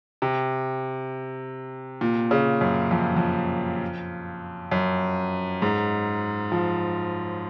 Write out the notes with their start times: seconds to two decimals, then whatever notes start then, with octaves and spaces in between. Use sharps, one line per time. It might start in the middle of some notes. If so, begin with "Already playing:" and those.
0.22 C3
2.01 A#2
2.31 C#3
2.61 F#2
2.91 F2
3.16 F2
4.72 F#2
5.62 G#2
6.52 F3